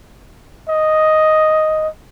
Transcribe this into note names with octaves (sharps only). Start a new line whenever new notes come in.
D#5